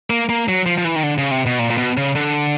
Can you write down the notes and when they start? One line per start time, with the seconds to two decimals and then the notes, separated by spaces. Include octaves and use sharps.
0.10 A#3
0.29 A#3
0.49 F#3
0.66 F3
0.78 F3
0.85 E3
0.96 D#3
1.03 D3
1.18 C#3
1.31 C3
1.46 B2
1.59 A#2
1.70 A#2
1.78 B2
1.97 C#3
2.15 D3